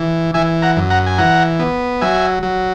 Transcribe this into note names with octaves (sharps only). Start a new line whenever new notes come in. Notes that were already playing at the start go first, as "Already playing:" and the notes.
Already playing: E3
E3 E5 G#5
F#5 A#5
F#2
F#5 A#5
G#5
E3 F#5 A#5
B3
F#3 E5 G#5
F#3